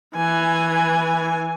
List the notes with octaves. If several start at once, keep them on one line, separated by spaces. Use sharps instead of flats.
E3 G#5